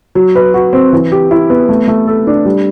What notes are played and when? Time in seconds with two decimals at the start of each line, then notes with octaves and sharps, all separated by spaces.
0.15 F#3
0.35 B4
0.54 F#4
0.73 C4
0.93 E3
1.12 G4
1.31 E4
1.50 B3
1.69 A3
1.88 A3
2.07 A4
2.27 D4
2.45 G3